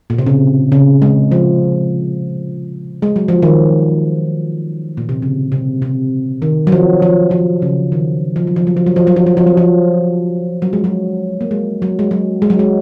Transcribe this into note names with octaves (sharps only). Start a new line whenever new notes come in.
A#2
C3
C#3
C#3
G#3
F3
G#3
F#3
F3
D#3
A#2
C3
C#3
C3
C3
D#3
F#3
F3
F3
F3
C#3
D#3
F3
F#3
F3
F#3
F3
F#3
F3
F#3
F3
F#3
F3
F#3
F3
F#3
G#3
F#3
A#3
G#3
F#3
G#3
F#3
G#3
F#3
G#3